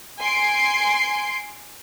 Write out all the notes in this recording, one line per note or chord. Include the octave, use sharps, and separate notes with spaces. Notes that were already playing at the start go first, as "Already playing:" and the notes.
G#5 C6 C7 D7